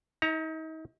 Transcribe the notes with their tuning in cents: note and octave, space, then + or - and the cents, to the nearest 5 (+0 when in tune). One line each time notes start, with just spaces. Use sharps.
D#4 +40 E5 -25 A#5 +0